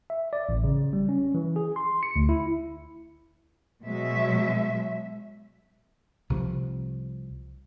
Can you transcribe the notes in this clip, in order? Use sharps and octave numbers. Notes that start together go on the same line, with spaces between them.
E5
D5
A1
C#3
G3
C#4
E3
G#4
C6
C#7
D2
E4
B2 F#3 G#3 E5
C2 C3 F3